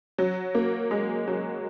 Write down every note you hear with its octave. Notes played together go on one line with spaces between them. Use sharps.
F#3
A#3
G#3
F#3